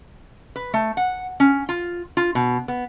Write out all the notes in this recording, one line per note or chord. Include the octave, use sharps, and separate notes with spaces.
B4
A3
F#5
C#4
F4
F4
B2
B3